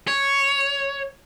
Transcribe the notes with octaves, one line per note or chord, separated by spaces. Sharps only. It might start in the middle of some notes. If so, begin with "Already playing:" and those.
C#5